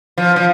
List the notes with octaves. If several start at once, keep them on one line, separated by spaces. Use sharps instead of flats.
F3
F3